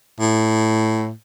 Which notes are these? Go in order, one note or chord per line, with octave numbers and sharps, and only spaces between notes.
A2